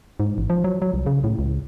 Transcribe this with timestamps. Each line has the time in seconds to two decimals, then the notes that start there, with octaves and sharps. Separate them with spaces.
0.20 G#2
0.38 A1
0.50 F3
0.64 F#3
0.82 F#3
0.94 C2
1.06 C#3
1.24 A2
1.39 C#2